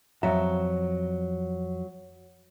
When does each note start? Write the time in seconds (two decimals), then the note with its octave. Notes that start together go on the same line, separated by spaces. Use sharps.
0.23 F2 F#3 E5 A#5